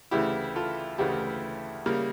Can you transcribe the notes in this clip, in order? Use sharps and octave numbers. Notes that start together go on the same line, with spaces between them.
D2 C#3 E3 A3 E4 G4
F4 A4
D2 C#3 E3 A3 E4 G4
C#3 G3 A#3